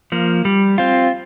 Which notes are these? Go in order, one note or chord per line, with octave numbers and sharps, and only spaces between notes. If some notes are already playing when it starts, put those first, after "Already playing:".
F3 A#3
G3
C4 F4